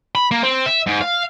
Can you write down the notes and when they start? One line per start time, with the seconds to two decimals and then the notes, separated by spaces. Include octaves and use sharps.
0.15 B5
0.31 A#3
0.43 C4
0.66 E5
0.86 G#2
1.01 F5